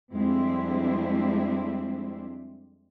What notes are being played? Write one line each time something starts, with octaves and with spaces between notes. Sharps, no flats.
F2 G3 G#3 C4 D4 E4